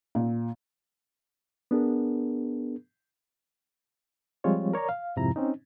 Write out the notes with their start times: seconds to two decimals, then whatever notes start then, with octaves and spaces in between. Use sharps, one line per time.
0.15 A#2
1.71 B3 D4 G#4 A#4
4.44 F3 G3 G#3 C4 F4 C#5
4.73 A#4 C#5 D5 A#5
4.89 F5
5.16 F2 G#2 C3 F3 E4 A#5
5.36 C4 C#4 D#4